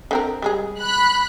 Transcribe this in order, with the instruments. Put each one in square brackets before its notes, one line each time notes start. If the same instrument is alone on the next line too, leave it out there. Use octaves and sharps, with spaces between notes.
[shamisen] D3 C4 A#4
G3 G#3 G#4
[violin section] B5 F#6